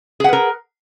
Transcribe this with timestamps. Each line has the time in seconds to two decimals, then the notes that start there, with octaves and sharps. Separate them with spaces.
0.20 G#4
0.24 F#5
0.29 B4
0.33 A#4